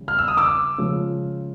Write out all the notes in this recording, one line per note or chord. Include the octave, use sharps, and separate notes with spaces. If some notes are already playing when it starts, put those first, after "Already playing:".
Already playing: C#3 E3 G3
F6
E6
D#6
D6 E6
C#3 F3 G#3